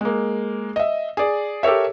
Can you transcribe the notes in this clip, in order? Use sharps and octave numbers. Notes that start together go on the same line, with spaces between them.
G#3 A#3
D#5 E5
G#4 D5
G4 A4 A#4 C#5 E5